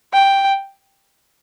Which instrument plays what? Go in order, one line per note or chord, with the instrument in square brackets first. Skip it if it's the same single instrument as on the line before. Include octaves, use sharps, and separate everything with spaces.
[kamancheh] G5